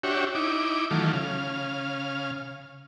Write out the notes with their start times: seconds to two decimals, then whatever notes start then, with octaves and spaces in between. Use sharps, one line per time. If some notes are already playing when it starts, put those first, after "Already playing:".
0.03 D4 F#4 G4 C#5 E5
0.35 D#4 E4 D6
0.91 D#3 E3 F#3 A3 F4
1.13 C#3 F5